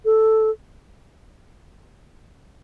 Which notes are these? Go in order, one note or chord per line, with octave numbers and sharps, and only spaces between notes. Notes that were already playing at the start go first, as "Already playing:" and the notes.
A4